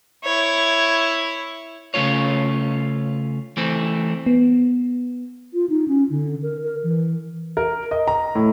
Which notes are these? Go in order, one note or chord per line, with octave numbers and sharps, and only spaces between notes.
E4 C#5
C#3 A3 C#4 F4 C#5
E3 A3 C4
B3
F4
D#4
C#4
D3
A#4
A#4
E3
A#4
D#5
A#5
A2